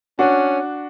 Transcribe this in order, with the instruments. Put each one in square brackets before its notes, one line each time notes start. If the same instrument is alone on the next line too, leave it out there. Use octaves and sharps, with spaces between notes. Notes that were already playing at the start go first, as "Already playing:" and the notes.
[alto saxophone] C#4 [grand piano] D4 F#4